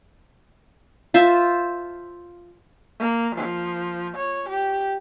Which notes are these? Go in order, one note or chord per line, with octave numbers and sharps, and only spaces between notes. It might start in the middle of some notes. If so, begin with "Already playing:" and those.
F4 C5 E5 A5
A#3
F3
C#5
G4